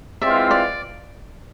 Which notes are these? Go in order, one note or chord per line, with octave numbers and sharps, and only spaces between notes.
E3 G#3 C4 F4 D5 E5
D5